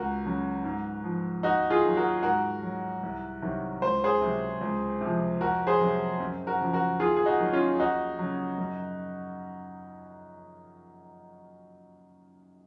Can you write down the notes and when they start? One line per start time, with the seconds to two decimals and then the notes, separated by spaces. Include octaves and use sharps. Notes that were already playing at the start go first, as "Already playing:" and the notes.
Already playing: C#2 F#4 A#4
0.25 C#3 F#3
0.64 G#2
1.04 F3
1.43 D#2 D#4 F#4
1.70 F4 G#4
1.84 D#3 F#3
1.97 F#4 A#4
2.23 G#2 F#4 A#4
2.63 F#3
3.03 C2
3.42 C3 D#3 F#3
3.82 C#2 C5
4.04 G#4 C5
4.21 C3 F#3
4.61 C#2
5.01 C3 F3
5.41 F2 F#4 A#4
5.67 G#4 C5
5.81 C3 F#3
6.20 F#2
6.47 F#4 A#4
6.61 C#3 F3
6.73 F#4 A#4
7.00 D#2 F4 G#4
7.16 G#4
7.26 D#4 F#4
7.40 D#3 F#3
7.53 C#4 F4
7.79 D#2 D#4 F#4
8.19 C#3 F#3
8.58 F#2